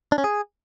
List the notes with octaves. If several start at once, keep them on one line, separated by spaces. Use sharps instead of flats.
D4
C#4
G#4